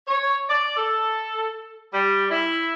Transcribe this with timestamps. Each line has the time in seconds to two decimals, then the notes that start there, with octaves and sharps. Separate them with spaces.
0.07 C#5
0.49 D5
0.77 A4
1.93 G3
2.31 E4